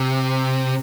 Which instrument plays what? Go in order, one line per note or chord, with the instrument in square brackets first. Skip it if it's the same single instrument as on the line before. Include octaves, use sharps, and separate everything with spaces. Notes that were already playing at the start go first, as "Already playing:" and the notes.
Already playing: [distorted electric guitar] C3